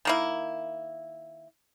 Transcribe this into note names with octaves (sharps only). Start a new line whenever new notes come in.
D#3 A#3 E4